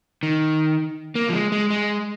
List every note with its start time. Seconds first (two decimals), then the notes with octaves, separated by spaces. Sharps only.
0.23 D#3
1.15 A#3
1.29 F3
1.33 G#3
1.52 G#3
1.70 G#3